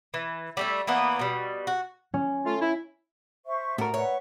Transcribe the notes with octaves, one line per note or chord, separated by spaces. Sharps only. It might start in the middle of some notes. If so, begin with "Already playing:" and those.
E3
G3 A3 E4
E3 A#3 B3
B2 G3
F#4
C#4
A3 F4
E4
C5 E5 C#6
A2 F#4 A#4 A5
B4 C#5 E5 F#5